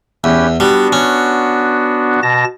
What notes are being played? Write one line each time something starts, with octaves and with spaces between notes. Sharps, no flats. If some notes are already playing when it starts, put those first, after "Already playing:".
E2 C#4 G4 B4
G3 B3 D4 F#4
C#4
B2 A5 A#6